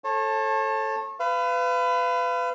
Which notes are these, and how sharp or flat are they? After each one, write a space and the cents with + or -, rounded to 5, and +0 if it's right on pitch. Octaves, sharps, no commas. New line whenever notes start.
A4 +0 C#5 -35 A5 +10
B4 +25 F5 -25